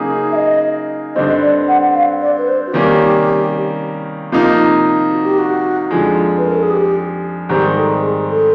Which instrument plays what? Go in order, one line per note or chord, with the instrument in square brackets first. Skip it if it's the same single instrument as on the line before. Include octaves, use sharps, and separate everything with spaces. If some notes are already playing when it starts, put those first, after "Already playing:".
Already playing: [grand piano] C#3 F#3 A#3 D#4 G#4
[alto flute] E5
D#5
[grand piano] G2 D3 G3 C4 [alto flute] D#5
[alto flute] D5
F#5
F#5
F5
D5
B4
C5
F#4
[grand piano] C3 D#3 G3 A#3 C#4 [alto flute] G4
[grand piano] C3 F3 A#3 D#4
[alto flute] F#4
G4
F#4
[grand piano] F2 D3 F3 G#3
[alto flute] B4
A#4
A4
G#4
G4
[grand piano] G#2 D#3 G3 C4 [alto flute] G4
[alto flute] A4
G#4
A4